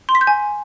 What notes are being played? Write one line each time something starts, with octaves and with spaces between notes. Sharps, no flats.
C6
B6
G6
G#5